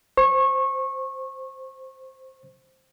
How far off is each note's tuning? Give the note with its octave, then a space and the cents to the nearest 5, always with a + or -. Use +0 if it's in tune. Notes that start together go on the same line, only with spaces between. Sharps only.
C5 +0 C#6 -25